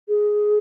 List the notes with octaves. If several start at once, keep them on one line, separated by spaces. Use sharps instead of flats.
G#4